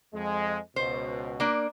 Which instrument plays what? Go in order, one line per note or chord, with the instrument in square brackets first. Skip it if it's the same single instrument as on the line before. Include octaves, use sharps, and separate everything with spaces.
[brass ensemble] F2 G#3
[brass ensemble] C#2 B2 [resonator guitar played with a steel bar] C5
[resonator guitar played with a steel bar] A#3 D4